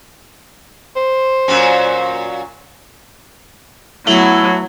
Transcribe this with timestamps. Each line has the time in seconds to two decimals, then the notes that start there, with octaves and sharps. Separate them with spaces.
0.96 C5
1.48 A#2 F#3 C#4
4.07 F#3 A3 B3 E4